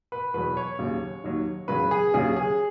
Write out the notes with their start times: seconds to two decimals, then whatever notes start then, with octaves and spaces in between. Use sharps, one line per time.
0.12 B4
0.34 E2 B2 F#3 B4
0.57 C#5
0.79 D#2 C#3 F#3
1.24 D#2 D#3 F#3
1.68 E2 C#3 F#3 B4
1.91 G#4
2.14 D#2 C#3 F#3 G#4
2.36 G#4